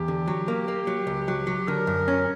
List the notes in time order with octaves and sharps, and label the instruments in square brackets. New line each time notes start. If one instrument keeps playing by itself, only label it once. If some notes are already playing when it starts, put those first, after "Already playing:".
Already playing: [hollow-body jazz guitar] E2 [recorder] G4
[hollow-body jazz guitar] D3
F#3
A#3
A#3
F#3
C#2
F#3
F#3
[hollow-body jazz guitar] D3 [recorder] A#4
[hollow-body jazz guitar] F#2
C#4